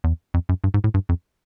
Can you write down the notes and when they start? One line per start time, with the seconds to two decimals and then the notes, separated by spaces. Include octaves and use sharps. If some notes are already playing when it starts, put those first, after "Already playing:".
0.04 E2
0.34 F2
0.49 F#2
0.64 G2
0.74 G#2
0.84 A2
0.94 G2
1.09 F2